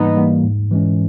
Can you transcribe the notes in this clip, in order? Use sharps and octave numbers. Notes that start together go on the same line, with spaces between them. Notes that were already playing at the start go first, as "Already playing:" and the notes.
Already playing: G#2 E3 G3 A#3 B3 D#4
E3 G3 A#3
G#2
E3 G#3 C#4